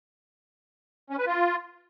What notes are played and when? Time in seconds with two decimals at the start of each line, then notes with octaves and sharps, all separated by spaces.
1.10 C#4
1.18 B4
1.26 F4